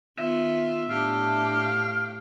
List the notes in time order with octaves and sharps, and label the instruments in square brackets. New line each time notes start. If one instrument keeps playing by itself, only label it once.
[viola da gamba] D#3 B3 F4 [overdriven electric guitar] E5
[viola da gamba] A2 G4 [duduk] D4 [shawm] F5